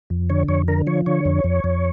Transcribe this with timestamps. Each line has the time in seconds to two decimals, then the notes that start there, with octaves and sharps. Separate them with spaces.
0.10 F2
0.30 D3 C#5
0.48 F2 C#5
0.68 D3 A#4
0.87 F3 C#5
1.06 D3 C#5
1.25 F2
1.44 F2
1.64 F2